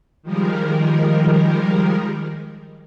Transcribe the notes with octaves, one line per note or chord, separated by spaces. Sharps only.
D#3 F3 G3 G#3 A#4